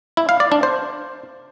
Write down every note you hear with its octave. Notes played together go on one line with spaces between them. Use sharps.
E4
F5
D5
D4
C5